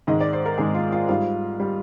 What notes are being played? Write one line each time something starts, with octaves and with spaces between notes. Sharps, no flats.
G#2 D#3 G#3 D#5
D5
C5
A#4
G#2 D#3 G#3 G#4
F4
F4
G#2 G3 F4
G3